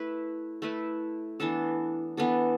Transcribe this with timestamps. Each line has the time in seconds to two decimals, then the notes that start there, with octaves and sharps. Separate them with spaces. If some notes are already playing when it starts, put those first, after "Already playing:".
Already playing: A3 E4 B4
0.62 A3 E4 B4
1.40 E3 B3 D4 A4
2.17 E3 B3 D4 A4